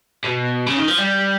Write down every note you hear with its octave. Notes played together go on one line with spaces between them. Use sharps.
B2
C#3
D#3
F3
G3